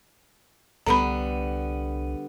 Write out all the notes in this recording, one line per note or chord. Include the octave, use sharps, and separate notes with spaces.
C2 D3 G3 B3 A#5 B5